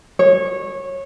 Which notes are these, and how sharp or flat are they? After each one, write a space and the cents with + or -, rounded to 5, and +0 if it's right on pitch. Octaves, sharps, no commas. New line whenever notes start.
C#5 -20